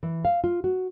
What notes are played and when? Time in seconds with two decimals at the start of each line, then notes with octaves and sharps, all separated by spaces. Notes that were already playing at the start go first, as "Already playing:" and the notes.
0.03 E3
0.25 F5
0.44 F4
0.64 F#4